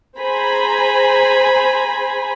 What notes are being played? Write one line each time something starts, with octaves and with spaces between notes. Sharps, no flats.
G#4 C5 G#5 A#5 B5